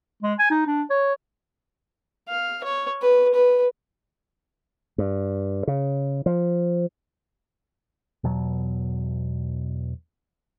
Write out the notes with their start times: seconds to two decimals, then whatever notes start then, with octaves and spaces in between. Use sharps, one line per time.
0.22 G#3
0.39 G#5
0.51 D#4
0.67 D4
0.90 C#5
2.29 F5
2.64 C#5
3.02 B4
3.34 B4
4.98 G2
5.67 C#3
6.26 F3
8.24 E2 B2 F#3